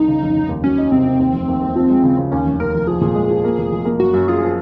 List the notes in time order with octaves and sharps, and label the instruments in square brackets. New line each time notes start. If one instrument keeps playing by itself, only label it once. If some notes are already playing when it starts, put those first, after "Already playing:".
Already playing: [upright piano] C2 [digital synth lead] D#4
[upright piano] C#3
F1
F1
D#2
[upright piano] F#3 [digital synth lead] C#4
[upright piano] D#4
[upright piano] C3 [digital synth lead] C4
[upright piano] C3
D#2
F1
D#2
D#2
F3
G#3
C#3
C#3
[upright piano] D#2 [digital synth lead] C#4
[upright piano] F1
[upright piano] D#2 [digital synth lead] A#4
[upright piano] F1
[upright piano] F3 [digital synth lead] G#4
[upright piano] A#2
G#3
F3
A#3
F1
F1
A#3
[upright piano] F#2 [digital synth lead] F#4
[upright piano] F#2
[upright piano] F4 [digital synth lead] G#4
[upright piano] F3